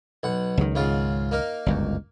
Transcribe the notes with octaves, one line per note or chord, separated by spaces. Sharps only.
B1 F#5
C#2 D#3
G#2 C#3 F4
A#3 D#4 A#4
G1 C#2 F#2